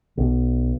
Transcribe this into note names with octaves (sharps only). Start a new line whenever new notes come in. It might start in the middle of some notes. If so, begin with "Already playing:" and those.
B1